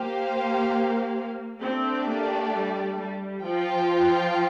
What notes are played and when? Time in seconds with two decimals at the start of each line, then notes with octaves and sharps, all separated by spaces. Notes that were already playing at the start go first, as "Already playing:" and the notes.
Already playing: A#3 G4 C5 F5
1.61 A3 C4 D4 G4 D5
2.07 A#3
2.53 G3
2.98 G3
3.43 F3 F4 C5 G5